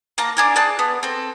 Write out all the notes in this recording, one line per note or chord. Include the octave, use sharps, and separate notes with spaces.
A#3 A5 A#5
D4 G#4 A#4
G#4 D5 A5 F#6
B3
C4 A4